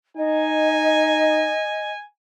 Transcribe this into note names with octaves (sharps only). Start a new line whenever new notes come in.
D#4 D#5 G#5